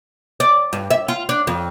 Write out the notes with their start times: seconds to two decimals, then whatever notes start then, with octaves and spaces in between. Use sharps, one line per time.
0.40 D5
0.73 G2
0.91 E5
1.08 F4
1.29 D4
1.47 F2